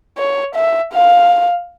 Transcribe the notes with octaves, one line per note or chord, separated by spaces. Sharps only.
C#5
E5
F5